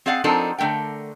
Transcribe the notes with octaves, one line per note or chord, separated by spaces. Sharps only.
C4 G#4 D5 F5 F#5
F3 C4 D4 D#4 A4 A#4
D3 A3 A#4 G5